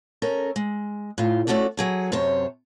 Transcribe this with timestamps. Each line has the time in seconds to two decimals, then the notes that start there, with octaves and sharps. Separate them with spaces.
0.22 C#4 A4 A#4
0.56 G#3
1.18 A2 F4
1.47 A3 C#4 F#4 A4 D5
1.77 F#3 G#4 A4
2.12 F#2 C3 C5 C#5 A5